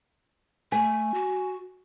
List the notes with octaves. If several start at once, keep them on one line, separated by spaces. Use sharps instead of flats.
A3 G#5
F#4